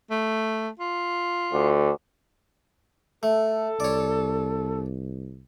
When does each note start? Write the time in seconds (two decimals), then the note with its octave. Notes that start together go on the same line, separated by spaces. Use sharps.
0.11 A3
0.79 F4
1.53 D2
3.23 A3 A4
3.80 C2 C#5 D5